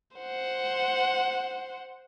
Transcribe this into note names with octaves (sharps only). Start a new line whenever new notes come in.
C5 F#5